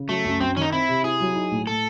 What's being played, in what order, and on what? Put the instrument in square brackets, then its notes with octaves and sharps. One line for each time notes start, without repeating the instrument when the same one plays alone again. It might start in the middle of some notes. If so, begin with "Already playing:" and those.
Already playing: [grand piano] C#3
[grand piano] F#3 [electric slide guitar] A3
[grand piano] F#2
[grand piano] F#2 [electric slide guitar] C4
[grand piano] D#3 [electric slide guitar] C#4
[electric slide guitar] D#4
[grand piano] C4 [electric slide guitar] E4
[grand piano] C3
[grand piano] E4 [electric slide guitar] G#4
[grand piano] F#3
D#4
A2
[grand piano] A2 [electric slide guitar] A4